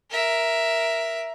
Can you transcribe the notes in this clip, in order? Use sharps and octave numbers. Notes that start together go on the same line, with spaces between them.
A#4 E5